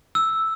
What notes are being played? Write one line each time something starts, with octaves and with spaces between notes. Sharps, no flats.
E6